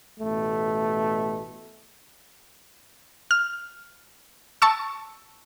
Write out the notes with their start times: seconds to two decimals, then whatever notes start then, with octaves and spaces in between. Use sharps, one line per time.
0.20 A1 B2 A3
3.31 F6
4.62 A5 C#6 E6